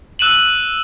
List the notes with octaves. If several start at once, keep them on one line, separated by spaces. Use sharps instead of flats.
E6 F#6 D#7 E7 F#7